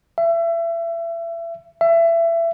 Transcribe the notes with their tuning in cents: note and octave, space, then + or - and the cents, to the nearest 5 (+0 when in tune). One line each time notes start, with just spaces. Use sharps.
E5 +30
E5 +25